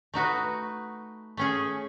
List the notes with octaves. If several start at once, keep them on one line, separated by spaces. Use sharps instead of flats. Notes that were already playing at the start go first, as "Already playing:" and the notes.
A3 D#4 F#4 B4
A3 C#4 G#4